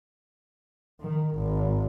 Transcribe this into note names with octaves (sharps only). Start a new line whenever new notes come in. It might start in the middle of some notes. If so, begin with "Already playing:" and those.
D#3
G#1